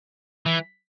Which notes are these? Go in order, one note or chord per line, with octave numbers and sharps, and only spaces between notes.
E3